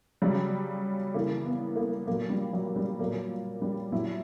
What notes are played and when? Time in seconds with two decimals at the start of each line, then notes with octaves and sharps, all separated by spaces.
0.22 C#3 F#3 G3
1.14 C#3 E3 A#3
1.46 B3
1.76 A#3
2.07 A#2 F#3 A#3
2.30 G3
2.53 F#3
2.76 G3
2.99 A#2 F#3 A#3
3.62 G3
3.92 A#2 F#3 E4